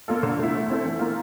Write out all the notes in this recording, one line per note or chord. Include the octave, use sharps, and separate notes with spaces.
A#3 F4 A4
D3
A3 E4
A3
C4 E4 A4
E3
A#3 F4